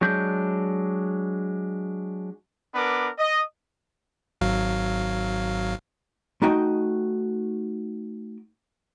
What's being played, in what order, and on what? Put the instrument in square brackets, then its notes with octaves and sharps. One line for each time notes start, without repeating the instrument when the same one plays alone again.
[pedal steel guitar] F#3 G#3 D4 G6
[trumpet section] B3 D4 A#4 B4 D6
D#5
[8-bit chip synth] G#1 F#3 F5
[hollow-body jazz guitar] A3 D#4 F#4 D#5 G5